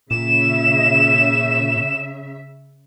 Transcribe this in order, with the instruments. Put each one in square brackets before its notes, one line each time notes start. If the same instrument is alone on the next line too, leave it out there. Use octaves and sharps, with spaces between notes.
[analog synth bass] A#2 [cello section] C#3 E5 [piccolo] E7